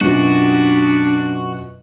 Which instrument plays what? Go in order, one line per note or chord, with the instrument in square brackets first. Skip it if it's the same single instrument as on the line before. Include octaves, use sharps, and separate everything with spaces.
[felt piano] F#2 B2 F4 [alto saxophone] D4 [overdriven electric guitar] F#4